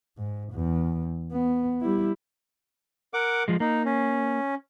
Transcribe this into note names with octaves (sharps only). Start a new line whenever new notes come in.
G#2
E2
B3
G3 E4
A#4 F#5 D6
F3 G#3
A#3 D#4
C#4